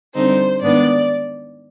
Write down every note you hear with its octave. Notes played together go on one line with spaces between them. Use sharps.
D3 G3 C4 D#4 C5
G#2 D#3 B3 D4 D5